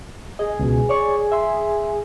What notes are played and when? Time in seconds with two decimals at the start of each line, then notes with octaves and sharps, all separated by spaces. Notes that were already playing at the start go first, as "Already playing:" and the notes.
0.39 G#4 D#5
0.59 C#2 B2
0.89 C#5 D5 C#6
1.32 E5 C6